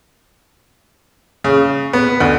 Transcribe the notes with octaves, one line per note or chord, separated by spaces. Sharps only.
C#3
B3
D2